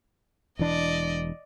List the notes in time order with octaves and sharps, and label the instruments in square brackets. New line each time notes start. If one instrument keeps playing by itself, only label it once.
[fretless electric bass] E1 E3 D4 [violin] D5 D#5